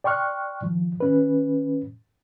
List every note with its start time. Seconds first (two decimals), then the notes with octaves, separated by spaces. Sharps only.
0.04 D5 G5 C6 C#6 F6 F#6
0.62 D#3 F3
1.00 D#3 C#4 B4